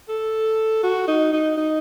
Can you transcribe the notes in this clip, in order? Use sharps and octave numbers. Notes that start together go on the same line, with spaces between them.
A4
F#4
D#4
D#4
D#4